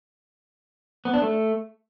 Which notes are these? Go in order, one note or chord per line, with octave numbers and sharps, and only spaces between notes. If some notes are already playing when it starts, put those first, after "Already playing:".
B3
D4
A3